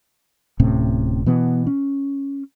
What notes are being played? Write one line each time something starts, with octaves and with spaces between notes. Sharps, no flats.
D1 A2 C3 C#4
B2 E3 B3
C#4